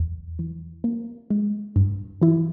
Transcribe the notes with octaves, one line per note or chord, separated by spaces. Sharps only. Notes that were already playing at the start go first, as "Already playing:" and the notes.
Already playing: E2
E3
A#3
G#3
G2
E3 E4